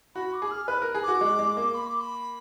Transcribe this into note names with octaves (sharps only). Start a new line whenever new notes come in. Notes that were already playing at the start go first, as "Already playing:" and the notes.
F#4 B5
D6
G#4
F6
B4 F#6
A#4
G#4
F#4 D6
G#3
G#3
A#3
B5
D6
B5